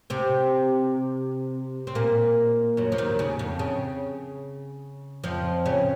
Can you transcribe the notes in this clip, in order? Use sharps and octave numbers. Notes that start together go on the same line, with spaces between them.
C3 C4
C4
A#2 A#3
F#2 F#3
F3
D#2 D#3
C#3
F2
C#3
F2 F3
C#3 C#4